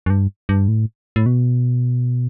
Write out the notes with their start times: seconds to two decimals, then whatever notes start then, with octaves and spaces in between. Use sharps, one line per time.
0.06 F#2
0.10 G2
0.49 G2
0.68 A2
1.16 A2
1.26 B2